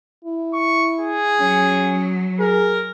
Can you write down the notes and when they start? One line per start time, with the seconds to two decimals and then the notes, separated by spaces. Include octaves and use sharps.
0.25 E4
0.53 C#6
1.00 G#4
1.40 F#3 C#4
2.39 G#4 A#4